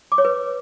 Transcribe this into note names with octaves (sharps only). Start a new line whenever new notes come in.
D6
C#5
B4